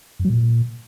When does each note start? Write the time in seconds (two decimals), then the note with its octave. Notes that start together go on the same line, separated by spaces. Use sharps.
0.19 F#2
0.25 F#3
0.30 A#2